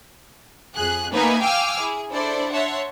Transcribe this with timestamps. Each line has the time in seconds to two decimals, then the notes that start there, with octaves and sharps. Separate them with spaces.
0.74 F2 G#4 F#6
1.12 A#3 B3 D#4 B4 E5 G#5
1.41 F5 G5 G#5 D6 E6 F6
1.79 E4 G#4
2.10 D4 E4 A4 C5 D5
2.52 C#5 E5 F#5 A5 C6